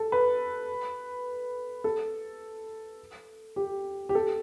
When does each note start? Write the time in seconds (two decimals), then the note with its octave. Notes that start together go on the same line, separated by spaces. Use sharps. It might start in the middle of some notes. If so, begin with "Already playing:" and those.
Already playing: A4
0.12 B4
1.84 A4
3.56 G4
4.09 G4
4.15 A4